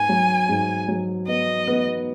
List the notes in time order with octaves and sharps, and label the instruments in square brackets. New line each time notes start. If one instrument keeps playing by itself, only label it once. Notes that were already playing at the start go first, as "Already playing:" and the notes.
Already playing: [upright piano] G#2 B3 [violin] G#5
[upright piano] F#3
G#2
F#3
[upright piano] B3 [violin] D#5
[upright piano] B3